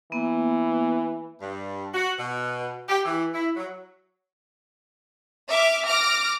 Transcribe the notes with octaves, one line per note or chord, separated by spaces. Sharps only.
E3 A#3 B3
G2
F#4
B2
G4
E3
E4
F#3
E5 D6 F6
D6 F6 A#6